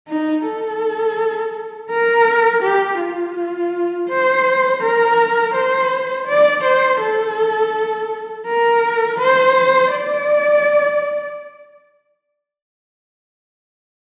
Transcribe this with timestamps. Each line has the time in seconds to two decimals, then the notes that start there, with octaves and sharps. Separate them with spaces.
0.08 D#4
0.45 A4
1.90 A#4
2.63 G4
3.00 F4
4.08 C5
4.82 A#4
5.54 C5
6.27 D5
6.63 C5
7.00 A4
8.46 A#4
9.19 C5
9.92 D5